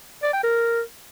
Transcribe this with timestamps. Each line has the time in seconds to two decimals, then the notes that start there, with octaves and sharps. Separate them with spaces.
0.23 D5
0.33 G5
0.43 A#4